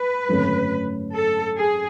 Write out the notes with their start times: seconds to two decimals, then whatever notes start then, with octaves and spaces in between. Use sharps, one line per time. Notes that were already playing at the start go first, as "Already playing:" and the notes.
Already playing: B4
0.28 G#1 F#2 D3 A3 C#4
1.14 A4
1.56 G#4